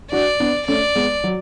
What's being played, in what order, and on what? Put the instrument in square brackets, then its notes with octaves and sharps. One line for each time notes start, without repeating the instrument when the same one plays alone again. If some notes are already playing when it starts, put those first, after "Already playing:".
[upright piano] D4 F#4 [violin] D5
[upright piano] B3 D4
[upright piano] A3 C#4 [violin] D5
[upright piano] G#3 B3
F#3